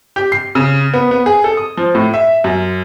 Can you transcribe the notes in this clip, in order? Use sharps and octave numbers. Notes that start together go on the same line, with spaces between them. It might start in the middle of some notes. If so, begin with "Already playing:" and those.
G4
C7
C#3
B3
B3
G#4
A4
D#6
F3
A2
E5
F#2